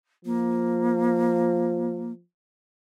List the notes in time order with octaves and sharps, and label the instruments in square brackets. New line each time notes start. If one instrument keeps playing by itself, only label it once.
[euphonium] F3 [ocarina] A#3